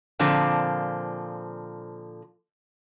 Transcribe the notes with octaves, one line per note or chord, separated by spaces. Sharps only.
A#2 D3 F3 C4